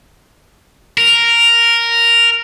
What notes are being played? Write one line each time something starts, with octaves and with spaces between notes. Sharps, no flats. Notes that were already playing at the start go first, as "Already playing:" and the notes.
A#4